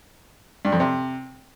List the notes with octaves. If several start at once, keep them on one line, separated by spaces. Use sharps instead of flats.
G2
F2
C3